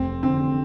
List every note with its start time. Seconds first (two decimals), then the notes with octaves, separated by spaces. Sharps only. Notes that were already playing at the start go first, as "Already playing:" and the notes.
Already playing: F1 C4
0.23 D3 C4